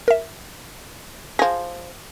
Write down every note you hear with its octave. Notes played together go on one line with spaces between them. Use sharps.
A#4 E5
F3 G#4 A#6